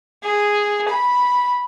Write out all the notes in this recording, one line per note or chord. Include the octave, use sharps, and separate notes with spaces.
G#4
B5